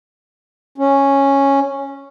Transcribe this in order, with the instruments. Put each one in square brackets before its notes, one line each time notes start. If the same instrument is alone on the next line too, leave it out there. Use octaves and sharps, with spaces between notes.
[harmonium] C#4